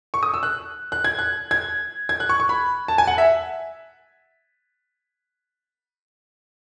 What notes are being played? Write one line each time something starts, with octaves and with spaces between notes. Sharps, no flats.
C#6
D#6
E6
F#6
F#6
G#6
F#6
G#6
G#6
F#6
C#6
C#6
B5
A5
G#5
F#5
E5